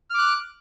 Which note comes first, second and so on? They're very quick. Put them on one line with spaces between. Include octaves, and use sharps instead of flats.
F6 D6 F#6